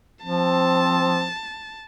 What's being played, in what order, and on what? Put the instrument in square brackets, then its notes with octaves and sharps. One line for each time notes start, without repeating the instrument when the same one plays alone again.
[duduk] F3 [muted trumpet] C4 [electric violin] A5